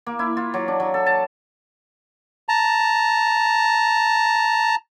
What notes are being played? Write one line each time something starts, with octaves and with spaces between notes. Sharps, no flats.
A#3
E4
F4
F#3
D4
F#3
A4
A5
A5 A#5